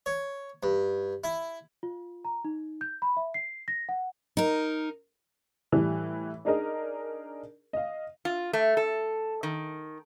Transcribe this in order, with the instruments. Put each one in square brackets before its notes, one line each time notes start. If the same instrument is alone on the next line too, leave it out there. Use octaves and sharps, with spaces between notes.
[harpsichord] C#5
G2
E4
[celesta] F4
A#5
D#4
G6
B5
E5
C7
A#6
F#5
[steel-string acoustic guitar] D#4 A#4
[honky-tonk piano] A2 E3 G3
D4 D#4 G#4 A#4 D#5
D#5 F5
[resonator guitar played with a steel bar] F4
A3
A4
D#3